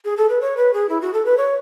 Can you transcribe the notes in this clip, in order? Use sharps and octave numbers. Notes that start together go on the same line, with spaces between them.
G#4
A4
B4
C#5
B4
G#4
E4
F#4
A4
B4
C#5